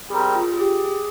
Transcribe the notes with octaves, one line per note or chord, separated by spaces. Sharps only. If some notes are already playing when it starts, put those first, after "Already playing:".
G3 C4 G4 G#4 A#4
F4
G#4
G4
G#4